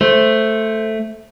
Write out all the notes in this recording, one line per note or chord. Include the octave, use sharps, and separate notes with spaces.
A3 C5